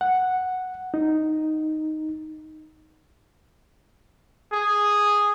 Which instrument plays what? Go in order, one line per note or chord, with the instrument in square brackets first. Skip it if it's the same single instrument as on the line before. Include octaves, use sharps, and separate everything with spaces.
[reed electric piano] F#5
D#4
[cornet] G#4